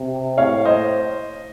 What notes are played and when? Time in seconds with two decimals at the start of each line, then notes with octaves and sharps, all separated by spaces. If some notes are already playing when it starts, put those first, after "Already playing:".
Already playing: C3
0.38 A2 C#5 F5
0.65 C5 D#5